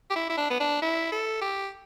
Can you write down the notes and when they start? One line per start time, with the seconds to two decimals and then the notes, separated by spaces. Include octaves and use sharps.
0.10 G4
0.15 E4
0.29 E4
0.37 D4
0.50 B3
0.60 D4
0.82 E4
1.12 A4
1.41 G4